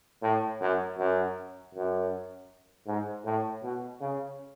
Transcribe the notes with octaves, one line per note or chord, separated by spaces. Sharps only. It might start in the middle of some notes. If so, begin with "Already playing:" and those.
A2
F#2
F#2
F#2
G#2
A2
B2
C#3